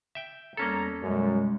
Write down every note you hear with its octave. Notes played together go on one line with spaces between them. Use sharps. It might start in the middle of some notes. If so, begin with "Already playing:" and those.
E5 G5
E2 G3 A#3 C#4 A4 A#5
F#2 B2 G3 G#3